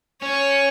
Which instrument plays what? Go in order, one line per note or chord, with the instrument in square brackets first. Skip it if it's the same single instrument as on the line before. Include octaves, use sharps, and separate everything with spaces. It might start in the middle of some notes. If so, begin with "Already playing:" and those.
[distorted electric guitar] C#4 [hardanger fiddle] C#5